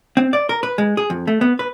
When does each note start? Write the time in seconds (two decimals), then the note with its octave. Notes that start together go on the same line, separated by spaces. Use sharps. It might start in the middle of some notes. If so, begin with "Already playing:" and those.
0.17 C4
0.33 D5
0.49 A#4
0.63 B4
0.78 G#3
0.97 G#4
1.10 F2
1.27 A3
1.41 B3
1.59 B4